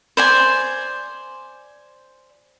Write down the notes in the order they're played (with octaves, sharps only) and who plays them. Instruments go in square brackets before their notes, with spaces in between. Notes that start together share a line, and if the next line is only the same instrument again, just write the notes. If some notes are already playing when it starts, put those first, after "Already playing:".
[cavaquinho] C5 D5 G#5